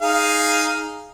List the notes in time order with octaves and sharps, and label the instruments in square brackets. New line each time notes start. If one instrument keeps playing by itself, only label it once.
[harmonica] D#4 G#4 F5